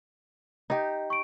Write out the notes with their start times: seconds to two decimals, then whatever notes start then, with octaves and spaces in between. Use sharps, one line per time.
0.70 D#4 G4 D#5
1.10 C#6 D7